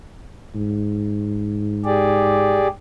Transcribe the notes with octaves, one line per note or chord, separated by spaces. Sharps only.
G#2
G4 G#4 D5